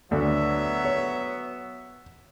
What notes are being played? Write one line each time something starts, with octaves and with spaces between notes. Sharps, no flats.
D2 F#3 B3 E5
C#5